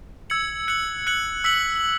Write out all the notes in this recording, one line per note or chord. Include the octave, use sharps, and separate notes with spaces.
E6 G#6 C#7 F#7
F#6 C#7 F#7
F#6 C#7 F#7
E6 B6 F#7